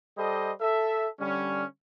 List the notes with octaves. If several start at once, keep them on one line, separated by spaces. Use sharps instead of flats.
G3 A4 C5 D#5
A4 E5
D3 G3 C#4